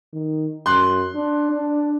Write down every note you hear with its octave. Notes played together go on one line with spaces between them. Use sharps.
D#3
F#2 C6 F#6
D4
D4